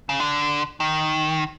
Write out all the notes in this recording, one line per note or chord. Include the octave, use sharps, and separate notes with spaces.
C#3
D3
D#3